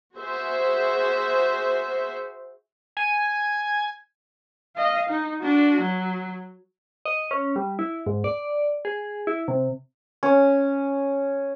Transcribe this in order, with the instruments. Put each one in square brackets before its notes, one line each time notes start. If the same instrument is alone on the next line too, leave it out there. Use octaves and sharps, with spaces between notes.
[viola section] F#4 G#4 C5 E5
[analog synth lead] G#5
[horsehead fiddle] D#5 F5
D#4
D4 F#4
F#3
[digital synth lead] D#5
C#4
G3
E4
G#2
D5
G#4
E4
C3
[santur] C#4